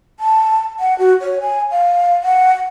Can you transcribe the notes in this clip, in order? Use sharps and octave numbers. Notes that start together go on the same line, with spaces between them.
A5
F#5
F#4
C#5
G#5
F5
F#5